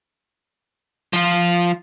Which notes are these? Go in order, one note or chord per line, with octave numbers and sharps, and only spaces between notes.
F3 F4